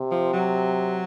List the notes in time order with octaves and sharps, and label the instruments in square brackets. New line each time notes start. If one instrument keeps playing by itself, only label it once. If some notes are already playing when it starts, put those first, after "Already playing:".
Already playing: [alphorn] C3
[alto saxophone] F3
F#3